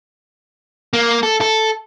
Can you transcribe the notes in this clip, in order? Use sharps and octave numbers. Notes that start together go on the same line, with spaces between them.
A#3
A4
A4